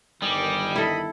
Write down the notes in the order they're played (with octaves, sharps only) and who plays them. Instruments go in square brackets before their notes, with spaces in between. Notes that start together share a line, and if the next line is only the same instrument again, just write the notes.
[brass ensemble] G1 D#3 [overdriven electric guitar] G3 [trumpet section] D#5 G#5 D6
[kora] E4 A4 [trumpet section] D#5 B5